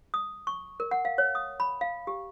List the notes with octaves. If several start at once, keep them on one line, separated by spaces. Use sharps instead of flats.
D#6
C#6
A#4
F#5
F5
C#5
D#6
B5
F5
G4